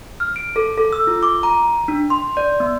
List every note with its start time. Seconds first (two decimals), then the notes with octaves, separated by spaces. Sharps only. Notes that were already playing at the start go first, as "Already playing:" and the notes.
0.20 F6
0.36 D7
0.56 A4
0.78 A4
0.93 E6
1.07 F4
1.23 D6
1.43 A#5
1.88 D4
2.10 C6
2.37 D5
2.60 B3